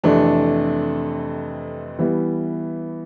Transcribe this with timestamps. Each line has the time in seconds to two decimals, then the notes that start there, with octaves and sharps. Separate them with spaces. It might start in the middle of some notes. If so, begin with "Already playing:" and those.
0.03 F2 C3 E3 A3 D4
1.99 E3 G3 B3 E4